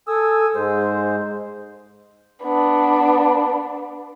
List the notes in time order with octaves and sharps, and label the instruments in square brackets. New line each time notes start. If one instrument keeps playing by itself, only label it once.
[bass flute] A4 [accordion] G#5 D#6 E6
[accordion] G#2 G#3 C5 [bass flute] G#4
[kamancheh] B3 D4